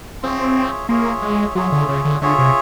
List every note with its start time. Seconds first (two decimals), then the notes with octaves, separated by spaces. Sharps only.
0.22 C4 F4 G#4 C#5 E5
0.89 A#3 F4 G#4 C#5 E5
1.22 G#3
1.55 F#3 F4 G#4 C#5 E5
1.72 D3
1.89 C#3
2.05 D3
2.21 D3 F4 G#4 C#5 E5
2.38 C3